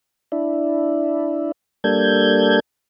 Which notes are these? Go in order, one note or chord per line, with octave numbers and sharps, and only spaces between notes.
D4 E4
G3 A#3 D4 A4 G6 G#6